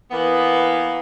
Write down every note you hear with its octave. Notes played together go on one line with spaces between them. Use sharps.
E3 A#3 B3